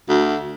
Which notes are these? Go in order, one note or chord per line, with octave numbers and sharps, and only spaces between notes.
D2